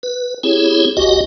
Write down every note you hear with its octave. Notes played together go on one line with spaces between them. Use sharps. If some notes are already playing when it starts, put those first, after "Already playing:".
B4
C4 E4 G4 G#4 C#5
F#1 C#2 F#4 G4 D#5